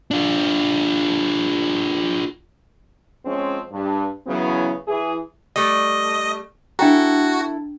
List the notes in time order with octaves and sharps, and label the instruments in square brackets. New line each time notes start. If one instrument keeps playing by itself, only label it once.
[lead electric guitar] D4 F4
[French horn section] F3 G#3 C4 C#4
G2
C#3 E3 F#3 B3 C#4 E4
E3 G#4
[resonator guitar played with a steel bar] G3 A3 [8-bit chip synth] D#5
[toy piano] D4 G5 A#5 [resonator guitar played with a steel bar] E4 A4 [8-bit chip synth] F#4